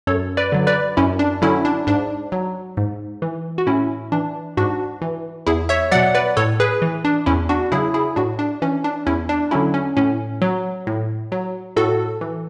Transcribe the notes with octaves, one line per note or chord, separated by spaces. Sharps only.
F#2 A4 C#5
B4 D5
D3 F#3
B4 D5
F#2 C#4 E4
D4
D3 F#3 C#4 E4
D4
G#2 D4
F#3
G#2
E3
F#4
A2 C#4 E4
E3 D4
G#2 D4 F#4
E3
E2 E4 G#4
C#5 E5
B2 F#3 D5 F#5
B4 D5
A2 A4 C#5
G#4 B4
E3
D4
E2 C#4 E4
D4 F#4
C#3 F#3 E4 G#4
E4 G#4
A2 D4 F#4
D4
E3 C#4
D4
E2 C#4 E4
D4
D3 F#3 C#4 E4
C#4
A2 C#4
F#3
A2
F#3
A2 F#4 A4
E3